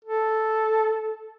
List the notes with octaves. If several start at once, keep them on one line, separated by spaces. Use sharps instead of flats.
A4